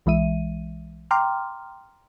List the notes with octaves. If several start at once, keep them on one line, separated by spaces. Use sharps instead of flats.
B1 E3 G#3 E5 D#7
G5 A#5 C6 D6 F6